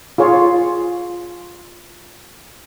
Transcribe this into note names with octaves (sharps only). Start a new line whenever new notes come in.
F4 G#4 C#5